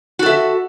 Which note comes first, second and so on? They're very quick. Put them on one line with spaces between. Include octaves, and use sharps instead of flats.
F#4 A4 E5